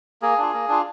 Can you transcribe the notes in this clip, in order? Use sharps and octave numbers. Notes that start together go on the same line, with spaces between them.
A#3 G#4
D4 F4
A#3
D4 F4